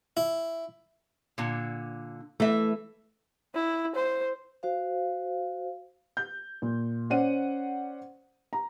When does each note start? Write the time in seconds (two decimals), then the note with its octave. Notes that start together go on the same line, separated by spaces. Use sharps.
0.17 E4
1.38 A#2 D3
2.40 E3 A3 E5
3.54 E4
3.95 C5
4.63 F#4 C5 F5
6.17 G6
6.62 A#2
7.10 C#4 C5 D5 F#5 D#7
8.53 A#5